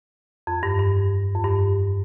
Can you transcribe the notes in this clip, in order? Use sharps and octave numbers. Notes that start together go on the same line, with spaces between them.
F2
G2
G2
F2
G2